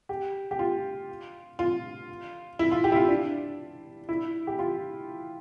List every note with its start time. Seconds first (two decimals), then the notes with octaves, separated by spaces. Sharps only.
0.09 G4
0.51 G4
0.59 F4
1.59 F4
2.59 E4
2.71 F4
2.84 G4
2.92 E4
2.96 F4
3.08 D4
4.09 E4
4.47 G4
4.59 F4